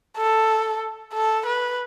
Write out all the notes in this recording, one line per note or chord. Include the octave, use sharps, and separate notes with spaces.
A4
A4
B4